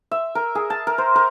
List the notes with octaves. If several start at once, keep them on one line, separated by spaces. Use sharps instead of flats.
E5
A#4
G#4
A5
A#4
C5
A#4